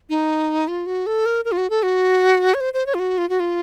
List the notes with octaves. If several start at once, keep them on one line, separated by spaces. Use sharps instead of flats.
D#4
F4
F#4
A4
A#4
A#4
F4
F#4
A4
F#4
C#5
C5
C5
C#5
F4
F#4
F4
F#4
F4